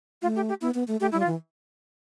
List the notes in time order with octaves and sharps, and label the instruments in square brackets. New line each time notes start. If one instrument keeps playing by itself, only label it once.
[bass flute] A3 [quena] F4
[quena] G4
G4
[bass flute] B3 [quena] E4
[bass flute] B3
A3
[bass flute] A3 [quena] G4
[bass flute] G3 [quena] E4
[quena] F4
[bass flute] E3